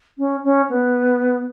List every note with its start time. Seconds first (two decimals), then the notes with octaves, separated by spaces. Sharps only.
0.18 C#4
0.44 C#4
0.69 B3